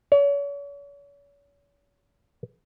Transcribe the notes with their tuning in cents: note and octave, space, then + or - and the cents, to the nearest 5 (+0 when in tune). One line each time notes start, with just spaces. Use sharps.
C#5 +40